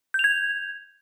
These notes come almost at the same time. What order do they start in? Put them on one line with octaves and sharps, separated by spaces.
G6 F7 G#6